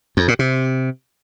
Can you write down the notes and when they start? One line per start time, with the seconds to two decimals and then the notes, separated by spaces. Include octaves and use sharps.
0.17 F2
0.28 A#2
0.39 C3